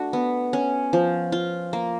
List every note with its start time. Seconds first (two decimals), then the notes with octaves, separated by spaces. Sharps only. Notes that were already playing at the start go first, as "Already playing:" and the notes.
Already playing: A3 D4 F#4
0.13 B3
0.53 C#4
0.93 F3
1.32 F4
1.73 A#3